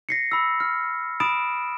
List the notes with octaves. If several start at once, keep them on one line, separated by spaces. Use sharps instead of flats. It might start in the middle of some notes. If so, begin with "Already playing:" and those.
A#6 C7 C#7
B5 E6
F6
B5 D#6 A6 D7 E7